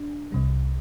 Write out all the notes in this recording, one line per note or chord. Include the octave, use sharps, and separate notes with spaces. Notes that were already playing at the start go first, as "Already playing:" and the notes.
Already playing: D4
C2 C3 G3